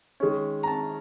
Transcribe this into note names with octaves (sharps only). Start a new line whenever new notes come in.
D#3 G#3 C#4
A#5
A5